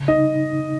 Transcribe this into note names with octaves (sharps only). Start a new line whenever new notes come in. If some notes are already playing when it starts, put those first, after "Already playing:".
Already playing: C#3
D#4 D#5